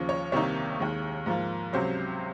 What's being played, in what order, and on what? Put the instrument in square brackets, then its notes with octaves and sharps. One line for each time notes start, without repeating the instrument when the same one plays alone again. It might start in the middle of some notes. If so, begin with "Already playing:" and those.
Already playing: [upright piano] D#2 C#3 F3
C#5
C2 C3 D#3 A#3 D#4 C#5
D#2 D#3 G#3
G#2 F3 A#3
C#2 C3 F#3 C5